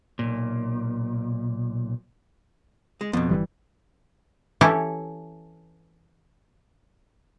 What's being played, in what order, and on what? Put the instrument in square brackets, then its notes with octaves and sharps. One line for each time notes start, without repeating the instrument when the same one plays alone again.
[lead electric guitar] B1 A#2
[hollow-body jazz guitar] G#3
[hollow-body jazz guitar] F2 B2 [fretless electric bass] B3
[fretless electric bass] G1 E3 G3
[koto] E3 C#4 E4 G4 A4 C#5